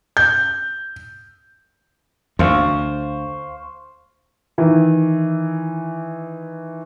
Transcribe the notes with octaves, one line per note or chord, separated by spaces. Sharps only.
G6
D2 C5 F5 C#6
D#3 E3